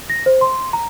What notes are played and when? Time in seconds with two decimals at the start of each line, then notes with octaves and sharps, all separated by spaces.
0.10 A#6
0.26 C5
0.41 C6
0.73 A#5